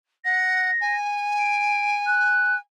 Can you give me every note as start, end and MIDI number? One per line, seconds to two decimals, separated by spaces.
0.25 0.71 78
0.25 0.96 94
0.81 2.58 80
1.39 1.95 98
2.07 2.55 90